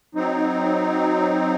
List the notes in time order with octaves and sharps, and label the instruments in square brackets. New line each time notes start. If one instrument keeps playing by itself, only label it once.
[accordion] F#3 C4 D#4